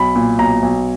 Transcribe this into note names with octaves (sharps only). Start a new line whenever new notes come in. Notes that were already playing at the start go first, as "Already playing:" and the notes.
Already playing: B1 B5
A#2
B1 A#5
B1